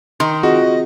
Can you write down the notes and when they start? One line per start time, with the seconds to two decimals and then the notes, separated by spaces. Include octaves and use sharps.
0.20 D#3 C6
0.43 C4 F4 F#4 G#4 D#5